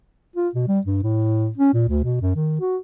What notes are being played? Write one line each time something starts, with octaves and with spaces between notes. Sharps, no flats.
F4
B2
G3
G2
A2
C#4
A#2
D2
B2
F#2
D#3
F#4